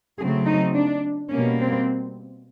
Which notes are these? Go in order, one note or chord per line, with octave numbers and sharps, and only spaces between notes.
C#3 F#3 A3 C4 G#4
D#4
D4
B2 G3 A#3 C#4
C4